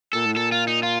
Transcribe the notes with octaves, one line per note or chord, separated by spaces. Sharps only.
A#2 A4
A2
A#2 A4
F4
D#4
F4